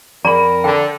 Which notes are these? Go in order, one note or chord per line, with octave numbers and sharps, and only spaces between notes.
F2 G#4 A#4 D5 A#5 B5
D3 G5